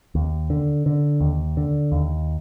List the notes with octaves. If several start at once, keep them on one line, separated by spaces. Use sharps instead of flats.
D#2
D3
D3
D#2
D3
D#2